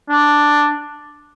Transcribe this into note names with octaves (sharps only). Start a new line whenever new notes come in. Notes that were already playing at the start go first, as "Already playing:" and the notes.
D4